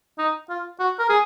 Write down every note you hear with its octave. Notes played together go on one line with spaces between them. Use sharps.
D#4
F4
F#4
A#4
G#4